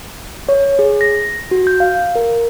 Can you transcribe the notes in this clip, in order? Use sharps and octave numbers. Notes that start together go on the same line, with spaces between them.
C#5
G#4
A#6
F#4
G6
F5
A#4